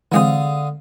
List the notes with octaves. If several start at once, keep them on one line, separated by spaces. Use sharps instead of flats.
D3 E3 G#3 C4 F5 D#6